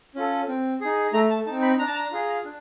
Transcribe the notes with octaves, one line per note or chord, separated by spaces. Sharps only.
C#4 F4 A4
C4
D#4 G#4
A3 A#5
A5
C4 D#4 A5
B5
D4 A#5
A5
A#5
F4 G#4
D4